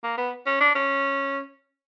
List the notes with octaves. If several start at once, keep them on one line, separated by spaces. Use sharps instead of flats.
A#3
B3
C#4
D4
C#4